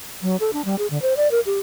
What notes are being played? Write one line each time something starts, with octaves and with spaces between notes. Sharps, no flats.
F#3
A4
D4
G3
G#4
D3
C5
D5
A#4
G4